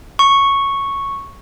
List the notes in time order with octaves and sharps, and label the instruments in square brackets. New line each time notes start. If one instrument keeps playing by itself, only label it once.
[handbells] C#6